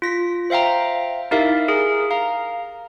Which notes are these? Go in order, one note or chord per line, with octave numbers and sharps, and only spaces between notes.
F4 A#6 B6
C5 E5 F5 G5 A#5
D#4 E4 G4 A#4 E5 F5
G#4 A#4
F5 A#5